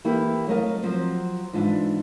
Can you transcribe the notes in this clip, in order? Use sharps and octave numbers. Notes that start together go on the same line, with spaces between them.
E3 A#3 E4 G4 A4
F#3 A3 A#4 D5 D#5 F5
F3 F#3 C4 F#4 C5
G#2 E3 D4 F4